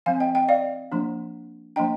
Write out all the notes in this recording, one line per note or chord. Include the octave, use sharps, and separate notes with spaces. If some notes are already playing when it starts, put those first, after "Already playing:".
F3 C4 F5 G#5
D#5 G5
D#5 G5
D5 F5
F3 A#3 D4
F3 A#3 D4 D#5 G5